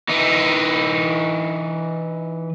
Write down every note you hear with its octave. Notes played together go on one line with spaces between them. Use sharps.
E3 D#4